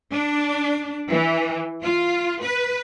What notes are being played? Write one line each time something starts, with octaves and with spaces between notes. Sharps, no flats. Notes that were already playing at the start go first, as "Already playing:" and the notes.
D4
E3
F4
B4